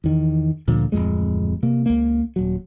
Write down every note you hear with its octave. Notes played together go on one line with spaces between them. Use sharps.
E2 D#3
D2 A#2 D3 F3
D1 C2 F2 G#3
C3 A#3
C#2 A#3
D#1 F#3